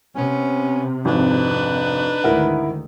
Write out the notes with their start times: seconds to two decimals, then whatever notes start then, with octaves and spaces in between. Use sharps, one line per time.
0.15 C3 B3 C#4
1.05 G#1 F2 D4 D#4 B4
2.24 D2 G#2 D#3 E4 A#4 F#5